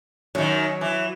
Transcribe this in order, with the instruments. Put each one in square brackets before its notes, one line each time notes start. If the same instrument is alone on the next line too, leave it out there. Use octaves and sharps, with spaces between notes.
[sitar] F#2 D#3 [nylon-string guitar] F#3
[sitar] E3